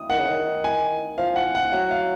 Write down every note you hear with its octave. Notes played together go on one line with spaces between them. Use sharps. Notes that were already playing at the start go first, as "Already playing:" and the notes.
Already playing: D#6
D#3 F#5
C#3
D#3
G#5
F3 F5
F#5
F#5
F#3 F#5
F5